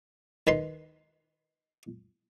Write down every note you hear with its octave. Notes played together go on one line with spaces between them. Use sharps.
D#3 B4 C6